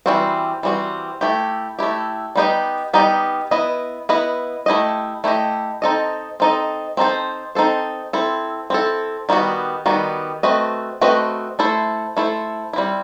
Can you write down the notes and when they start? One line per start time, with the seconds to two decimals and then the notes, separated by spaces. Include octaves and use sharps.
0.06 E3 G3 C4 F#4
0.63 E3 G3 C4 F#4
1.21 A3 E4 G4
1.79 A3 E4 G4
2.35 G3 B3 D#4 G4 D#5
2.93 G3 B3 D#4 G4 D#5
3.51 B3 E4 B4 D#5
4.09 B3 E4 B4 D#5
4.66 A3 E4 G4 D#5
5.24 A3 E4 G4 D#5
5.82 C4 D#4 A4 D#5
6.40 C4 D#4 A4 D#5
6.97 C4 D#4 A4 C5
7.55 C4 D#4 A4 C5
8.13 C4 E4 A4
8.70 C4 E4 A4
9.29 D#3 G3 B3 F#4
9.86 D#3 G3 B3 F#4
10.43 A3 C4 F#4 B4 D#5
11.01 A3 C4 F#4 B4 D#5
11.59 A3 E4 A4 C5
12.17 A3 E4 A4 C5
12.73 G3 C4 E4